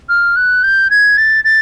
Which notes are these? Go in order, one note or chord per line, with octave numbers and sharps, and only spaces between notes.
F6
F#6
G6
G#6
A6
A6